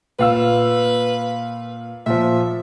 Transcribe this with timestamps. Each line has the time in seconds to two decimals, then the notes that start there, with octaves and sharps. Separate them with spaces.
0.19 A#2 B4 F5 E6
2.06 A#2 F3 E5